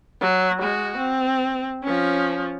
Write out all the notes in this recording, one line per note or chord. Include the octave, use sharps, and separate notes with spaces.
F#3
G#3 F#4
C4
F3 C#4